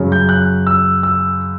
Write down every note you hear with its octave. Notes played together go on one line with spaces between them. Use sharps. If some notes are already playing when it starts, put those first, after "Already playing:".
Already playing: F#2 C#3 F#3 C#4
G6
F#6
E6
E6